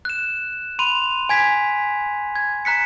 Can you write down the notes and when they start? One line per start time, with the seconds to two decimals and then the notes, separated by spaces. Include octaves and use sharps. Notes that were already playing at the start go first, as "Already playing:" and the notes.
0.05 F#6 E7
0.79 B5 C6 D#7 F7
1.29 G#5 G#6 B6
2.35 G#6
2.65 A#5 F#6 B6 C#7